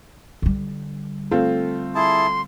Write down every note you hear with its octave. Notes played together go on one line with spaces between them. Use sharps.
D3 G3
A3 C4 F4
E4 G#4 A5 C6